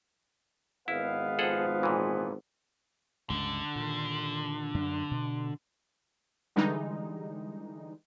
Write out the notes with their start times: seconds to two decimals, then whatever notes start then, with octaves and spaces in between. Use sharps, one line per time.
0.88 G#1 G#3 B3 E4 F5
1.39 F3 G#4 A4 F#5
1.83 A#2 E3
3.30 C#2 G2 D3
3.76 A#2 D#3
4.74 F#2 D4
5.11 B2
6.56 D3 E3 G3 G#3 D#4